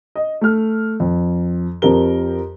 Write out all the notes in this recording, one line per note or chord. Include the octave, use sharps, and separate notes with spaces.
D#5
A3 F6
F2
F2 F3 C4 G4 A#4 G7